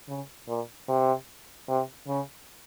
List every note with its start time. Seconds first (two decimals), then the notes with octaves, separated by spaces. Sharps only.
0.08 C#3
0.48 A#2
0.88 C3
1.68 C3
2.08 C#3